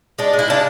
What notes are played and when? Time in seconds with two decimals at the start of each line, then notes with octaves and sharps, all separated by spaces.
0.19 G#3 D4
0.33 G#3
0.39 E4
0.48 C#3 D4